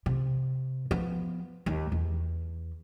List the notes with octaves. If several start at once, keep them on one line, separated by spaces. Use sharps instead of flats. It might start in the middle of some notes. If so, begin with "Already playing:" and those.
C3
F3 B3
D#2
E2